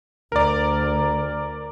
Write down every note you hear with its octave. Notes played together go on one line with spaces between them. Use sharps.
D2 A#4 D5